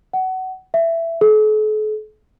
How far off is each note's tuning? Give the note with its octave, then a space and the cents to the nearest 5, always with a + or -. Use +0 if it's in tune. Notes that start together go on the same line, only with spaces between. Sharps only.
F#5 +20
E5 +15
A4 -45